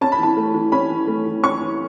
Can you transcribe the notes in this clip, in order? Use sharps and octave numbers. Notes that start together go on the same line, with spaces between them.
C#4 A5
B5
E3 A5
A3
E3
C#4 B5
E3
A3
E3
C#4 C#6
E3